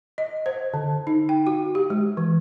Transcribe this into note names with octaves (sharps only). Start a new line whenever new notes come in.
D#5
C5
D3
D#4
G5
F#4
G4
G#3
E3